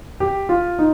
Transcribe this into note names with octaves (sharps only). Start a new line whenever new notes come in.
G4
F4
D#4